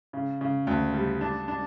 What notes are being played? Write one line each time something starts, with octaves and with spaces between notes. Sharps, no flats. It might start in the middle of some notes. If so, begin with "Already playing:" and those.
C#3
C#3
D2
G3
D4
D4